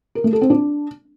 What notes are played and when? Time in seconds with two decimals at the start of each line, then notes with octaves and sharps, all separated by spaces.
0.15 A#4
0.24 A3
0.33 A4
0.41 C4
0.50 D4